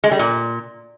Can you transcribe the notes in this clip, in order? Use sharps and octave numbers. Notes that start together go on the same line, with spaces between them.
G#3
G3
A#2